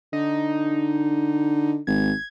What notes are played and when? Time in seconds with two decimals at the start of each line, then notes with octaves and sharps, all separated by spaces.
0.13 D3 D#4
1.87 G#1 G#6